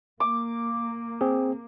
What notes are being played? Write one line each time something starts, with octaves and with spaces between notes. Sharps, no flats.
A#3 D6
C4 G#4